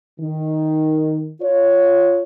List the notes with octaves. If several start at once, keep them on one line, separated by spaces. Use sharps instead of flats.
D#3
F4 C#5